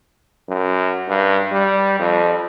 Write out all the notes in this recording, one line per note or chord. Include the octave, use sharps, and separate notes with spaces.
F#2
G2
G3
F2